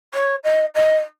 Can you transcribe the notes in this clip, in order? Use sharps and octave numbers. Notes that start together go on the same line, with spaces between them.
C#5
D#5
D#5